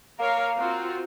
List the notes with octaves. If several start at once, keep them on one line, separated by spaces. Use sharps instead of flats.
A#3 A#4 C#5 F5
C4 F4 F#4